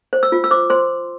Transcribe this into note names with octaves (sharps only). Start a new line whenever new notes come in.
C5
E6
F4
E6
C5 D6
C5 C6